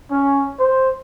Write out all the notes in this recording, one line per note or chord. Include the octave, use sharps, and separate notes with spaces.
C#4
C5